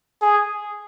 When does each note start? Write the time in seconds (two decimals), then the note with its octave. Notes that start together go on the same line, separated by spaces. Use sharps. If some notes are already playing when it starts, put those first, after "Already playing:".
0.22 G#4